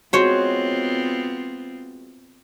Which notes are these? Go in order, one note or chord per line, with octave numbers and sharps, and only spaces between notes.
G#3 B3 C4 F4 F#4 C5 C#5